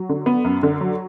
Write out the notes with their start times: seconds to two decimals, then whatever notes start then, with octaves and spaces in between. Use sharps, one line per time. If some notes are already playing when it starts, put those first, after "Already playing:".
Already playing: F#3
0.09 D3
0.26 B3
0.45 F#2
0.63 D3
0.81 F#3